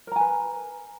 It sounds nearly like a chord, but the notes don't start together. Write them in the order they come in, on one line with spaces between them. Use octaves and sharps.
A#4 A#5 G#5 B4